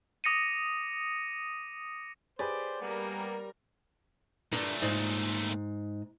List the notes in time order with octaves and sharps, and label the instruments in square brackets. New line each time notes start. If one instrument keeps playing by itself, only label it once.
[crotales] D6 D#6 A#6 C#7 D#7
[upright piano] G4 G#4 B4 [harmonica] C5 [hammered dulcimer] D5
[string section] G3 A#4 [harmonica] A#3 B3
[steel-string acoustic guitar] G2 [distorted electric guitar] A#2 A3
[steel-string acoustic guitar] G#2